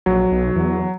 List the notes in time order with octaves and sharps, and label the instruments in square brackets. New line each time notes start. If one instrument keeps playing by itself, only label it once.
[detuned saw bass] A#1 [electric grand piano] F#3
[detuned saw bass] B1
E2